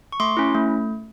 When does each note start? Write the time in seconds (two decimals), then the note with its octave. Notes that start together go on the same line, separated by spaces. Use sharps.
0.12 C#6
0.20 A3 C6 D6
0.37 C#4 E4
0.55 A3